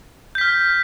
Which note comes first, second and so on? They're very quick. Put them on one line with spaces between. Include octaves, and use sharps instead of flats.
G6 B6 F6